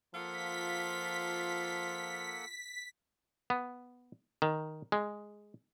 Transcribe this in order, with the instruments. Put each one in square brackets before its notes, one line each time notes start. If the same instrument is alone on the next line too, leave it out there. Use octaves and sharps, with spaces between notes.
[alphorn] F3 [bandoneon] A#3 A4 F#5 [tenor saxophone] F4 [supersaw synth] B6
[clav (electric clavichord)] B3
D#3
G#3